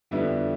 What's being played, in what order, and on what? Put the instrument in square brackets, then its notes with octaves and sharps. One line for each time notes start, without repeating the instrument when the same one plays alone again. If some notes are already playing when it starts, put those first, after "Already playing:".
[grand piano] F2 D3 G3 B3 E4